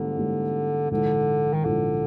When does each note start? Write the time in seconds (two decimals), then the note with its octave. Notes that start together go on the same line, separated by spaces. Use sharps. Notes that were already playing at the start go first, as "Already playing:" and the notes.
Already playing: G#2 D3 E3 G3 A#3 C#4
0.17 G#2 E3 G3 A#3 C#4
0.91 A#1 G#2 D3 E3
1.54 D#3
1.65 A#1 G#2 D3 E3